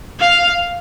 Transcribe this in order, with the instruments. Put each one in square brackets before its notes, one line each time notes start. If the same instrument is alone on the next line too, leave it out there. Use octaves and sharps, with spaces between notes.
[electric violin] F5